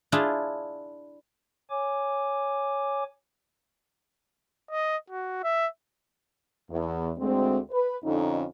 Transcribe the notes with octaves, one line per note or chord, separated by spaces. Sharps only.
D4 E4 F4 G#4
C#5 G#5 D6
D#5
F#4
E5
E2
D2 G#3 C4
B4
F2 D3 C#4 D#4